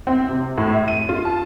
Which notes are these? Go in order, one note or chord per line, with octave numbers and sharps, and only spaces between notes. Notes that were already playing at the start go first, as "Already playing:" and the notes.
C4
C3
A2
E5
D#7
F4
A5